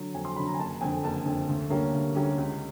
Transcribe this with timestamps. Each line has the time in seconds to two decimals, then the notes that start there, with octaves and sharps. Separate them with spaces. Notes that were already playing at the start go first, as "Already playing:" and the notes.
Already playing: D3 F#3
0.14 F2 G#5
0.25 C6
0.36 F#3 B5
0.39 D3
0.47 A#5
0.54 G#5
0.58 F#1 A5
0.81 F2 D3 G#5
1.04 F#1 A5
1.25 F2 D3
1.49 D2
1.70 D3 G3 A#3 C#4
1.93 D2
2.15 D3 G3 A#3 C#4
2.38 C#2